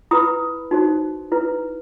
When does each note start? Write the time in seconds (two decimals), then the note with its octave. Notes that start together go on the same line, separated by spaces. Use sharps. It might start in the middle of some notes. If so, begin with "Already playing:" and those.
0.11 E4 B4 B5 D#6
0.71 D#4 F#4 C5
1.32 E4 B4